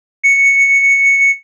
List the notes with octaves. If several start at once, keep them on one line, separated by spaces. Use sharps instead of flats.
C#7